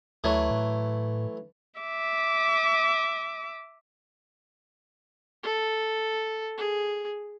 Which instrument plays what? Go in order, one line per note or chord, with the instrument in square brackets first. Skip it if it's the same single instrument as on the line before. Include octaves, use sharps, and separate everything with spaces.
[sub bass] D2 [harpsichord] E3 F#3 A3
[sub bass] A2
[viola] E5 D6
[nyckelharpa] A4
G#4